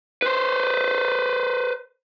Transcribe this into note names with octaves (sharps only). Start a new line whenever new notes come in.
B4 C5